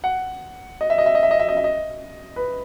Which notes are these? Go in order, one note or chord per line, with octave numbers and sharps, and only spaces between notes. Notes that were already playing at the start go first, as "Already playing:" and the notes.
F#5
D#5
E5
D#5
E5
D#5
E5
D#5
E5
D#5
E5
D#5
B4